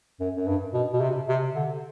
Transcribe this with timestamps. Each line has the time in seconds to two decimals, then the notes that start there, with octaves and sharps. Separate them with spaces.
0.20 F#2
0.36 F#2
0.47 G2
0.74 B2
0.93 B2
1.00 C3
1.29 C3
1.55 D3